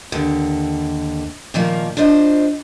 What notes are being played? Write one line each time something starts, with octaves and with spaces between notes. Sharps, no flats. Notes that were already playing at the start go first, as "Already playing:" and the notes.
D#2 D3
A#2 D#3 F3 A#3
D4 F4 C5 D#5